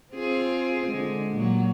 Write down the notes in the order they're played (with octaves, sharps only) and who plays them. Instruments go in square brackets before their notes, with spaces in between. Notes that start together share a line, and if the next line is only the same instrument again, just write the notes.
[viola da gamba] C4 F4 G#4
D3 G#3
A#2 F#3